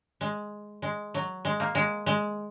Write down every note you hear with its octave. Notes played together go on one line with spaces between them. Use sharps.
G#3
G#3
F#3
G#3
A#3
G#3
G#3